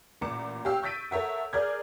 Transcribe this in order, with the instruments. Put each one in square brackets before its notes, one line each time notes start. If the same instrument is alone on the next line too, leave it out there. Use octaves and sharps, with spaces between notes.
[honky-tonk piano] A1 A#2 A#5 D6 C#7 E7
G4 C#5 F5 E6
C#6 G6 A6 B6 D7 D#7
A4 A#4 C#5 E5 F#5
G#4 A#4 D5 F6 G6 G#6